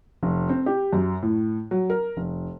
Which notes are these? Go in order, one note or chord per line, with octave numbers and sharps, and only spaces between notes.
F1
C4
G4
F#2
A2
F#3
A#4
F1